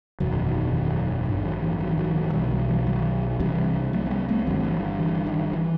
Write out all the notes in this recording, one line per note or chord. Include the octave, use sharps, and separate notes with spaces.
F#1 E2 B2 D#3 F#3
D#3
D#3 F#3
A1 G2
D#3 F#3
E3
D#3 F#3
D#3 F#3
D#3 F#3
B1 B2 E3 G3
D#3 F#3
E3 G3
D#3 F#3
C2 C3 E3 G3
F#3 A3
C4
G3 B3
A3 C4
G1 G2 D#3 F#3
E3
E3
D#3
E3